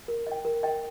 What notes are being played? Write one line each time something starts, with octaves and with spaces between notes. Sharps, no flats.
A#4
D#5 G5
A#4
D#5 G5